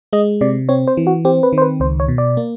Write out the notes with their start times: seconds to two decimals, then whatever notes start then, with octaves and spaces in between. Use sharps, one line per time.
0.13 G#3 D#5
0.41 C3 D5
0.69 C4 C#5
0.87 C5
0.97 E3
1.07 F#4
1.25 C4 G4
1.43 B4
1.53 D#3
1.58 C5
1.62 B4
1.80 C#2 C5
2.00 C#5
2.08 B2
2.18 D5
2.37 A#3